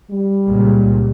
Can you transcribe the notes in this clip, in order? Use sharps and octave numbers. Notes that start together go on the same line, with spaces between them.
G3
C#2 A#2